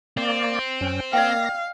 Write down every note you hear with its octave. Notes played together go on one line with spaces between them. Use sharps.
A#3 C4 D5
F#2 C#4 G5
A#3 D5 D#5 F5 G5 A#6